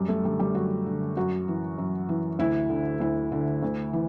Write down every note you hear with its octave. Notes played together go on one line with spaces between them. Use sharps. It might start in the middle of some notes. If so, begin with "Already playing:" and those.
Already playing: F#2 G3
A3
D3 G3
G3
F#2 F#4
D3
F#2 F#4
E3
F#2
E3
D2 E4
D3
D2 E4
D3
D2
E3